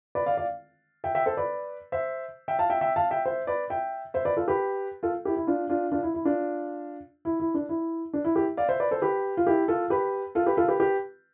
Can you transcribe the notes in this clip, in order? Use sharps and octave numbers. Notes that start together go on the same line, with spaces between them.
B4 D5
D5 F5
D5 F5
E5 G5
E5 G5
A4 C5
B4 D5
C5 E5
E5 G5
F5 A5
E5 G5
E5 G5
F5 A5
E5 G5
C5 E5
B4 D5
E5 G5
C5 E5
B4 D5
F4 A4
G4 B4
F4 A4
E4 G4
E4
D4 F4
D4 F4
D4 F4
E4
E4
D4 F4
E4
E4
D4
E4
D4
E4
E4 G4
D5 F5
C5 E5
B4 D5
A4 C5
G4 B4
F4
E4 G4
F4 A4
G4 B4
F4 A4
G4 B4
F4 A4
G4 B4
G4 B4